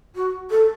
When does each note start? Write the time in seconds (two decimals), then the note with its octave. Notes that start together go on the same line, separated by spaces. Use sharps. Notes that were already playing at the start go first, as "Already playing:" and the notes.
0.15 F#4
0.50 A4